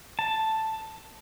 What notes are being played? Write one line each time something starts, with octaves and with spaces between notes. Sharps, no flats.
A5